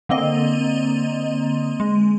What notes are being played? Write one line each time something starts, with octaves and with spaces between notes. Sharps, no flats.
D3 A#3 C4 D#5
G#3